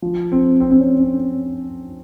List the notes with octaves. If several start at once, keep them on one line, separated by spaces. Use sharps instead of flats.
F3
C4
C4
C4
C#4
C#4